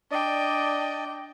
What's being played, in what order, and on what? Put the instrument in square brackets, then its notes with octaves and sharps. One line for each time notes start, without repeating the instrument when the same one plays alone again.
[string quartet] D4 G5 [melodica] D5 D#5